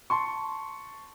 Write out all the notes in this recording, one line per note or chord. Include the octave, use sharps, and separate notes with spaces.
A5 C6 C#6